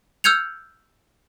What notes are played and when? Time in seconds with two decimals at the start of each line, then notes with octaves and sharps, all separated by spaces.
0.24 E6 F6 G6 G#6 C#7 F7